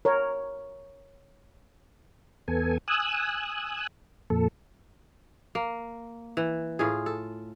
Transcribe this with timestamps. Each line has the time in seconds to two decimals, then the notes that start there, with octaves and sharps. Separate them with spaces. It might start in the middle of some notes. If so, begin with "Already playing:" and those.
0.05 A#4 C#5
2.48 E2 B3 A4 G#5
2.88 G#5 D#6 E6 F#6
4.30 F2 A#2 A4
5.55 A#3
6.37 E3
6.79 A2 F4 G#4
7.06 A4